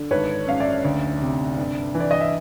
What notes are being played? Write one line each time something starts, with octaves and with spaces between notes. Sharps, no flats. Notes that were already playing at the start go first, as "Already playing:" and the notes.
Already playing: D3
G#1 B4 C#5
F#2 F5
D5 E5
D2
C3
G2
E3
D5
D#5
E5